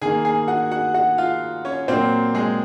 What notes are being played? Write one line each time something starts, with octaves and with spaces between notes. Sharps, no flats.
D#3 A#3 G#4 G#5
G#4 G#5
F#4 F#5
F#4 F#5
F#4 F#5
F4 F5
C#4 C#5
A#2 F#3 A#3 C4 C5
G#3 G#4